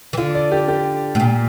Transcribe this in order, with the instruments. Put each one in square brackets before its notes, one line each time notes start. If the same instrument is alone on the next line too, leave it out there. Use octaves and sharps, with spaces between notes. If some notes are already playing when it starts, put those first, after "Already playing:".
[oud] E3
[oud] D3 [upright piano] F4
[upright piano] D5
G4
G4
[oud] A2
A#2